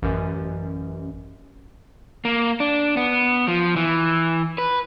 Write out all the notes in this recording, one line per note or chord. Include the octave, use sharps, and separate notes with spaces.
A1 F#2
A#3
D4
B3
F3
E3
B4